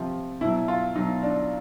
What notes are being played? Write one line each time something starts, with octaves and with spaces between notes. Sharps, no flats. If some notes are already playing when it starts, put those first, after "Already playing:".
Already playing: C3 F3
B2 F#3 E4
F4
B2 F#3 D#4
D4